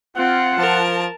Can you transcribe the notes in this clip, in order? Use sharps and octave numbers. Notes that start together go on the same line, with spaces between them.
C4 F4 F#5
F3 A#4 A5